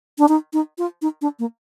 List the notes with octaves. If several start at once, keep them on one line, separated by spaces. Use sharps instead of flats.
D4
D#4
D#4
F4
D#4
D4
A#3